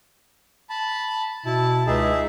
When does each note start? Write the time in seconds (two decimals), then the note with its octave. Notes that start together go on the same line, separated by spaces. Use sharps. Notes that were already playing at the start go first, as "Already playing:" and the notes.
0.70 A5 B5
1.46 B2 E4 A5
1.87 C#2 D#4 G#4 E5